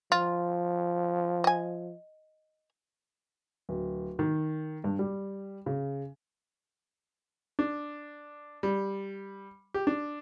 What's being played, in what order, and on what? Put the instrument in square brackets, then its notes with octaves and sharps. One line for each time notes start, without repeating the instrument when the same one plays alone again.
[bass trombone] F3 [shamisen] F4
[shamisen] D#5 G#5
[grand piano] D1
D#3
G2
G3
C#3
[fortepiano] D4
G3
G4
D4